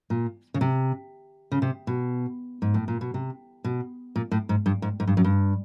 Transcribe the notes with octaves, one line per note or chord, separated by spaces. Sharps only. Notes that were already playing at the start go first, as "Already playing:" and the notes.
A#2
C#3
C3
C#3
C3
B2
G#2
A2
A#2
B2
C3
B2
A#2
A2
G#2
G2
G#2
G#2
G2
F#2
G2